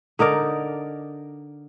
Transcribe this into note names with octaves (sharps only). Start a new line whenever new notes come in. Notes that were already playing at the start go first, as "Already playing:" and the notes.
D3 D#4 A#4 D5